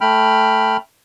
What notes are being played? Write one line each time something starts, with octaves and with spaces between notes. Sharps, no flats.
A3 G5 B5 F6